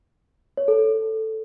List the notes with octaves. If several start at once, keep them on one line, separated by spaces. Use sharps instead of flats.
C#5
A4
A4